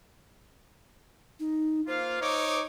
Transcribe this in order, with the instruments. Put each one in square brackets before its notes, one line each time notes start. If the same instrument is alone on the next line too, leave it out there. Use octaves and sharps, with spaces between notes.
[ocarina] D#4
[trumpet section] A#3 F4 F5 [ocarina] C5
[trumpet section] D#4 C#5 D6